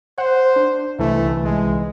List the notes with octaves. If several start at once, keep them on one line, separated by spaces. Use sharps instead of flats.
C5 F#5
D4
C2 D3 E3 A3
G#3